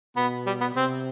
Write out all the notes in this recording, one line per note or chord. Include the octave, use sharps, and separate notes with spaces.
B2 B3
G3
B3
C3 C4